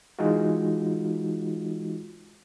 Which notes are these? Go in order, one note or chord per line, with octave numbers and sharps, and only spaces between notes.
E3 G#3 D#4 F4 F#4